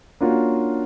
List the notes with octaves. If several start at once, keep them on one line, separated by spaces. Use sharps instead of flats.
A#3 C#4 D4 F4 F#4